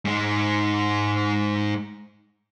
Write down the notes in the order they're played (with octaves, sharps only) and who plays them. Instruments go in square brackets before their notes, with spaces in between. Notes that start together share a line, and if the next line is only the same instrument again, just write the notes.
[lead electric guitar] G#2 G#3